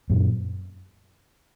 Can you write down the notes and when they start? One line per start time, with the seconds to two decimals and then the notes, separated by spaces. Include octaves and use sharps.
0.10 F#2 A#2